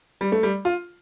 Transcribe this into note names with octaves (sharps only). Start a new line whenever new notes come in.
G3
A3
G3
F4